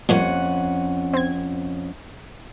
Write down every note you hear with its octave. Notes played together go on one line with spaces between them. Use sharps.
F2 F3 G3 A#3 C#4 F#5
C4 G#6